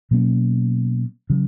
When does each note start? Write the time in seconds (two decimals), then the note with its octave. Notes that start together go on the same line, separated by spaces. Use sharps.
0.11 B2 F#3 A#3 C#4
1.30 C#3 F#3